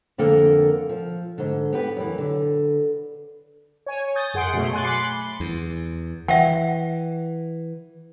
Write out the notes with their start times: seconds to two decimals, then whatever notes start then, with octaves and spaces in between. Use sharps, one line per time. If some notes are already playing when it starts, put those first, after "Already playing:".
0.18 F2 D3 A#3 A4 A#4
0.89 F3
1.38 G#2 D3
1.73 B3 G4 B4
1.97 F#2 E3
2.18 D3
3.86 C#5 G#5
4.16 D#6 G6 A6
4.34 F#2 G#4 F#5 C6 D7
4.53 B2 F#3 A3
4.73 G#5 C6 F#6 A6
4.85 B5 C6 D6 F#6 C7 C#7
5.40 E2
6.28 E3 E5 F#5 G5